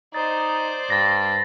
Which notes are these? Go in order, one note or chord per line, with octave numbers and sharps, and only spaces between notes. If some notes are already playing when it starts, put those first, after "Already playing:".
D#4 C5 D5 A6
G2 A6 A#6